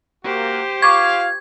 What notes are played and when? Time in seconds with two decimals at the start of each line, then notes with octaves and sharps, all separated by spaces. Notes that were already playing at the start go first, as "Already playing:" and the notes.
0.24 A#3 F#4 G4 C5
0.82 F4 F5 C#6 D6 G#6